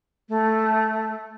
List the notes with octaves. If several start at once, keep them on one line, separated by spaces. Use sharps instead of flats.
A3